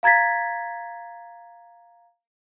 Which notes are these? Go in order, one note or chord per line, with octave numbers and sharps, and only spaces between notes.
F5 A#5 G#6 A6 B6